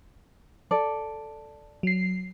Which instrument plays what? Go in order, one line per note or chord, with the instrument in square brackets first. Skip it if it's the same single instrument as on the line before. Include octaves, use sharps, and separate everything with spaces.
[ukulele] A4 D5
[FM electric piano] F#3 C7